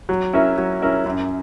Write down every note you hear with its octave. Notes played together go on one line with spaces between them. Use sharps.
F#3
C#4 E4 A#4 E5
F#3
C#4 E4 A#4 E5
F#2